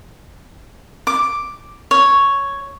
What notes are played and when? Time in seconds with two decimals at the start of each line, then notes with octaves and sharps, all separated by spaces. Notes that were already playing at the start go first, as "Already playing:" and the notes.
1.07 D6
1.91 C#5